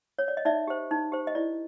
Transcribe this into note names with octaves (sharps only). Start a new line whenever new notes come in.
C#5
D5
D#5
D#4 D5 E5
G4 C5
D#4
G4 C5
D#5
E4 D5